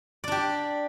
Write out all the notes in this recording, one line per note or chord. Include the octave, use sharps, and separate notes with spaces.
D4 G4 D5